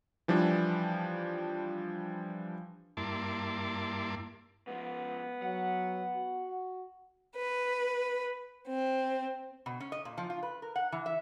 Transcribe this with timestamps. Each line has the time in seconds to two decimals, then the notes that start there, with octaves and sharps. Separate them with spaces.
0.28 E3 F3 G3 D4
2.97 G2 A#3 E4 A5 C6 D6
4.67 G#2 F3 B3
5.42 F#3 F#5
6.15 F#4
7.37 B4
8.68 C4
9.66 B2
9.80 C#4
9.92 D#5
10.05 A#2
10.18 F3
10.30 F4
10.43 B4
10.62 A#4
10.76 F#5
10.92 E3
11.06 E5